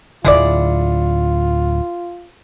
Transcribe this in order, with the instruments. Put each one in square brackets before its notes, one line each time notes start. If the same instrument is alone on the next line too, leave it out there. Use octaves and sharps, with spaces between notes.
[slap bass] D1 G#1 D3 [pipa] G#3 E4 D5 [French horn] F4